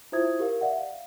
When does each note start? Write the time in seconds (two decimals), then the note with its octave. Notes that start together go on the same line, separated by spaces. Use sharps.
0.12 E4 F4 C5 E5 D#6 G#6
0.39 G4 A#4 F5
0.61 D5 E5 F#5
0.79 F5